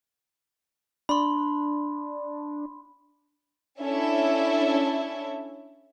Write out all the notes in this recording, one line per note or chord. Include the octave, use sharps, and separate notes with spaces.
D4 B5 C6
C#4 D4 E4 A4 E5